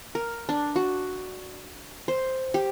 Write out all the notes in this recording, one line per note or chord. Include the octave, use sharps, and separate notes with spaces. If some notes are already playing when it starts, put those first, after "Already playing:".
A#4
D4
F#4
C5
G4